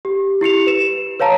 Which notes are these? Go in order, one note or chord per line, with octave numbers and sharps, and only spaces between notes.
G4
E4 G4 C#7 F7
B4 E7
B4 C#5 F5 A5 A#5